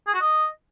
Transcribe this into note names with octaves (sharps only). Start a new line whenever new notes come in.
G#4
F#4
D#5